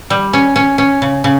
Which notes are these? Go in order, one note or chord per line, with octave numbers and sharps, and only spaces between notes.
G3
C#4
C#4
C#4
C#3
C#3